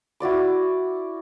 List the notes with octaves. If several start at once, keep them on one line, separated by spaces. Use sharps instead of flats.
E4 F#4 D5 D6